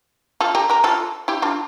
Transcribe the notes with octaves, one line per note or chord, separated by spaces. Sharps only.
F4 A4
G4 A#4
G4 A#4
F4 A4
E4 G4
D4 F4